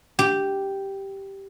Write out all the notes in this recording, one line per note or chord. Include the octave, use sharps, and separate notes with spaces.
G4